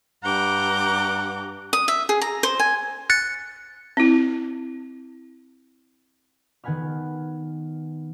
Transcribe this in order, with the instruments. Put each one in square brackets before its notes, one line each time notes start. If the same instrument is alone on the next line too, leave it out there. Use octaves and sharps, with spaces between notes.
[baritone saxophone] G2 [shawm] F#5 [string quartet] A#5 D6 G6
[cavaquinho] D#6
E5
G#4
A#5
C5
G#5
[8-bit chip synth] F#6 A6 C#7
[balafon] C4 E4
[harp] D#3 B3 F#5 G#5 B5 F6